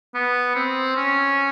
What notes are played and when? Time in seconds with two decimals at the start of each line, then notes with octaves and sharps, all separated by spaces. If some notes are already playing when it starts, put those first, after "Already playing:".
0.15 B3
0.56 C4
0.96 C#4